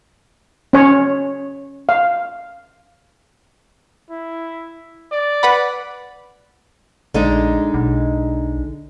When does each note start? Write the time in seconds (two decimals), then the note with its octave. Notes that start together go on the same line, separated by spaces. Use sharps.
0.73 C#4 C#5
1.89 F5
4.10 E4
5.12 D5
5.43 B4 F#5 B5
7.14 A#1 D3 G#3 D#4
7.74 B1